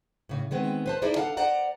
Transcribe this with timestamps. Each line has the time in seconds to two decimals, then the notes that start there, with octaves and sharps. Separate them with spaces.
0.29 A2 C#3
0.51 D#3 G#3 B3 C4
0.86 B4 C5 A5
1.02 D#4 E4 G#4 C5 D5
1.16 D4 A4 F5 F#5 A5
1.37 C5 D5 F#5 A#5